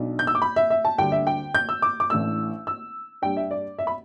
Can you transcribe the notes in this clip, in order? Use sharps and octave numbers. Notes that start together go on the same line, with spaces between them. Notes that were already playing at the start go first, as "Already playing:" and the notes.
Already playing: B1 B2 D4
G6
E6
D6
B5
E5
E5
A5
D2 D3 G3 G5
E5
G5
G6
E6
D6
D6
A1 A2 A3 D4 E6
E6
G2 G3 D4 G5
E5
D5
E5
B5